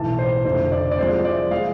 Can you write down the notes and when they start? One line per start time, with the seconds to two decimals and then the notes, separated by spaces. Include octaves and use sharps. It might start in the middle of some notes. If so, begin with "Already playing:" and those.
Already playing: B1 A2 E3 A5
0.19 C5
0.44 F1 F2 D3 A3 C5
0.72 D5
0.91 D5
0.98 C2 C3 F3 G#3 C5
1.25 D5
1.51 G#3 F5